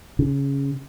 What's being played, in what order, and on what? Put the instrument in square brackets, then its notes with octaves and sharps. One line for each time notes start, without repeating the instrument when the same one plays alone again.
[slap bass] C#3